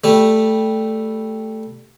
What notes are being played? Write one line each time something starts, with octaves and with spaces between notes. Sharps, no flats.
G3 A3